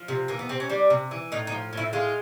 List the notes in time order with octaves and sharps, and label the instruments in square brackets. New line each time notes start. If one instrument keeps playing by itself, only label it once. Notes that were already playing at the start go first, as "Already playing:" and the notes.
Already playing: [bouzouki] F3
C3
E3 A#3
B3
C3 C4
C#4
G3 D4
C3
E3
A2 D#4
D#4
F3
A2 E4
G#3 F4